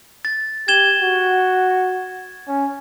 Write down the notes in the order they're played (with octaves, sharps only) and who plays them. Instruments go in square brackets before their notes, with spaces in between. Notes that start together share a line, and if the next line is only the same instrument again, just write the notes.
[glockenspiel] A6
[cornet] G4 [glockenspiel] G#6 E7 G7
[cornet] F#4
C#4